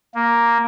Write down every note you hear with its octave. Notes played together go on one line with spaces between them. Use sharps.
A#3